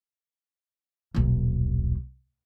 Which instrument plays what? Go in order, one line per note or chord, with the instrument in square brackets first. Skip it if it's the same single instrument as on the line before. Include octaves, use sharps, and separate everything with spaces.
[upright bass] D#1 B1